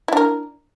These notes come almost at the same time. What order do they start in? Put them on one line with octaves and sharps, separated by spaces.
E4 D4 A#4